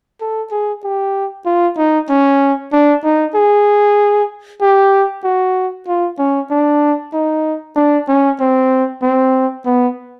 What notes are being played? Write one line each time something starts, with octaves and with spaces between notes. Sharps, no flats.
A4
G#4
G4
F4
D#4
C#4
D4
D#4
G#4
G4
F#4
F4
C#4
D4
D#4
D4
C#4
C4
C4
B3